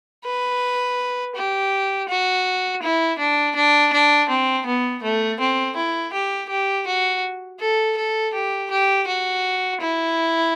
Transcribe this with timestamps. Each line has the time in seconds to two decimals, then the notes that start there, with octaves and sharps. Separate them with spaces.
0.25 B4
1.36 G4
2.09 F#4
2.82 E4
3.19 D4
3.56 D4
3.93 D4
4.29 C4
4.66 B3
5.03 A3
5.40 C4
5.76 E4
6.13 G4
6.49 G4
6.87 F#4
7.60 A4
7.97 A4
8.34 G4
8.71 G4
9.07 F#4
9.81 E4